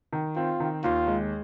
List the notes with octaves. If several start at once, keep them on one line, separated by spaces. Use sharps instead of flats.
D#3
C4 F4
D#3
D#2 F4
G#3